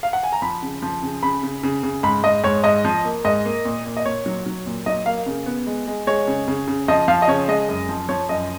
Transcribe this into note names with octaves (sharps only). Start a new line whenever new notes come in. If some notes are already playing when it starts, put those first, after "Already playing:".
F5
F#5
G#5
A#5
F3 B5
C#3
F3
C#3
C#3 B5
C#3
C#3
C#3
G#2 B5
G#2 D#5
G#2 C#5
G#2 D#5
F3
A#3
G#2 D#5
A#3
A#2
A#2
D#5
A#2 C#5
F#3
F#3
A#2
F#3 D#5
A#3 F5
C#3
B3
G#3
G#3
G#3 C#5
C#3
C#3
C#3
F3 D#5
F3 F5
D#5
C#3 C#5
G#3 D#5
F#2
F3
F3 C#5
F#2 D#5